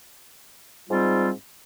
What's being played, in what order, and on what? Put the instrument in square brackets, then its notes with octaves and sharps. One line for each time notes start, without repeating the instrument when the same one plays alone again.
[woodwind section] G#2 G3 C4 F4